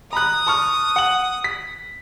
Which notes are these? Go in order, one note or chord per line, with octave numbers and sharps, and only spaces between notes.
A#5 B5 D#6 F#6
A5 C#6 F6
F#5 F#7
B6